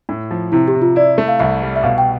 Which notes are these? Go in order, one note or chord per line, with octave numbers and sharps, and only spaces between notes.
A2
F3
C3 E4
G4
C3
F4
E4 D5
A3
F5
C2 E5
G3
E5
B2 F5
G5